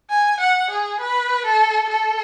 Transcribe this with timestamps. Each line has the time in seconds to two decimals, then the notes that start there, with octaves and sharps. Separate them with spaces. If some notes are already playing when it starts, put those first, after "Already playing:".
0.10 G#5
0.40 F#5
0.70 G#4
1.00 B4
1.46 A4
1.90 A4